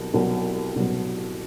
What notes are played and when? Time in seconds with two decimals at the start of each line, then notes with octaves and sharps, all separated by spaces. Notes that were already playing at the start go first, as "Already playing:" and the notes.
Already playing: C2 B2 F#3
0.14 C2 B2 F#3
0.76 C2 B2 F#3